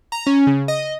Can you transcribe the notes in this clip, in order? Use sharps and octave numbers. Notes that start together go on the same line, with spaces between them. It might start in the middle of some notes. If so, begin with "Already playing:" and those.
A#5
C#4
C#3
D#5